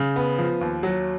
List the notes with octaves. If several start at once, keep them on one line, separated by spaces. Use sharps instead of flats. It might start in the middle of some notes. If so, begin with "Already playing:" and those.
Already playing: C#3
B3
F3
D#2
F#3